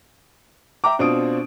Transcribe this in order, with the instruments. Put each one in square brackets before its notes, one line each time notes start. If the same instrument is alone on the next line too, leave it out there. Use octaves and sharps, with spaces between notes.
[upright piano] E5 G5 A#5 D6
B2 C4 D4 F4 D#6 D7